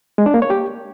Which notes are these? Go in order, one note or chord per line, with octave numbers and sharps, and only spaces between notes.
G#3
D4
A#3
C#5
G4